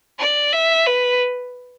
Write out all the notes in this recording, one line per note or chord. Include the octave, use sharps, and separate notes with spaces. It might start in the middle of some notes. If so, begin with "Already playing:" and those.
D5
E5
B4